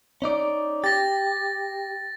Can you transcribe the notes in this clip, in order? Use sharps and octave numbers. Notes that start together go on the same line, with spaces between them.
C#4 D#4 D5
G4 A6 A#6